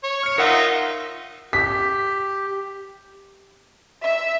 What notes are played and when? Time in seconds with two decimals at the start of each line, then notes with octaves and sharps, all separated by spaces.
0.04 C#5
0.23 F6 C#7
0.38 D#4 F4 A#4 E5 F#5
1.53 G4 B6
4.04 E5